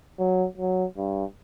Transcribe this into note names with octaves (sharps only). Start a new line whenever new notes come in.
F#3
F#3
G2